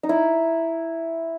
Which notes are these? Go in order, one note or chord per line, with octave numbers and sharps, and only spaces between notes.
D#4
E4